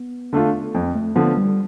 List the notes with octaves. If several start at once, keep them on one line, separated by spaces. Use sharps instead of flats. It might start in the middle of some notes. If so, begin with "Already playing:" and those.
Already playing: B3
D3 A3 D4 F4
F2 C4
A3
D3 F3 B3
G3